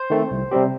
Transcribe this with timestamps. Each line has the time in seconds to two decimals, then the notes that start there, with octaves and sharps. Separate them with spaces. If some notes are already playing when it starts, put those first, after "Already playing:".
Already playing: C5
0.10 D#3 A3 C4
0.31 C2
0.51 C3 G3 C4 G4